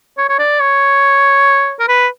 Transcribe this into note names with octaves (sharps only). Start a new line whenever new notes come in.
C#5
C#5
D5
C#5
A#4
B4